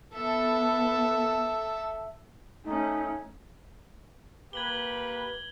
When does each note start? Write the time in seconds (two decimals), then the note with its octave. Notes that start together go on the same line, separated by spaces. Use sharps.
0.15 B3 A4 E5
2.64 A3 C#4 D#4
4.53 A#3 G4 B4 G#6 F#7 G7